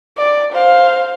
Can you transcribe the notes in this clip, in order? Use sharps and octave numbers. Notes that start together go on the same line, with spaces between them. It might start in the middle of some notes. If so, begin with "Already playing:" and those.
D5
C5 F5